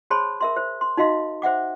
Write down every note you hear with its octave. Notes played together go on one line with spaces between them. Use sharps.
G#4 C5 C#5 A5 B5 C6
A#4 E5 C6
C5
C6
D#4 F#4 D#5 F5 C6
C5 E5 F#5 D6